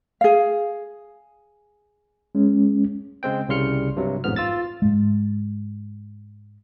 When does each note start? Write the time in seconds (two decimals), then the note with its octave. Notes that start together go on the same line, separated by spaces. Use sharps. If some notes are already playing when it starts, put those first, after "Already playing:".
0.21 G#4 F5
2.35 G#3 C#4
3.23 C#3 G#3 C4 G5
3.49 C2 C#3 G3 C6 F6 C#7
3.96 G2 C3 F#3
4.24 A1 F2 G#2 B3 F6
4.36 F4 E6 A6
4.82 G#2 G#3